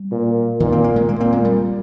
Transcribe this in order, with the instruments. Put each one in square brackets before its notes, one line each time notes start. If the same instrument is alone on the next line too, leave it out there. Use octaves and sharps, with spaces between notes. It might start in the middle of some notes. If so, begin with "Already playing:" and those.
Already playing: [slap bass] G3
[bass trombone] A#2
[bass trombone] A#2 [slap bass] D#3
[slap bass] C4
A#3
G#3
[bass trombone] A#2 [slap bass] A#3
[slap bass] C4
G#3
G3